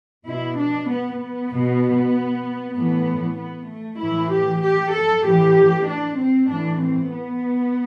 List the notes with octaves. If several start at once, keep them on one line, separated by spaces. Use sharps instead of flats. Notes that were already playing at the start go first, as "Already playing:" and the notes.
B2 E4
D4
B3
B3
B2
A2 E3 B3
B3
A3
A2 E3 E4
G4
G4
A4
A2 E3 G4
D4
C4
A2 E3 D4
C4
B3